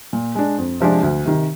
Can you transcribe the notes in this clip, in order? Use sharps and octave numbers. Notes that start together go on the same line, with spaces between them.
A#2
G#3 D4
F2
C3 F3 G#3 D4
D2
C3 D#3